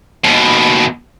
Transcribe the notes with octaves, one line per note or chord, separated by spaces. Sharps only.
D#2 B2